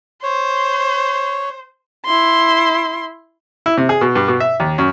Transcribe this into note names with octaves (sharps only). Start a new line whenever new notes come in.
C5 C#5
E4 C6
E4
C3
G#4
B2
G2
B2
E5
D#2
F#2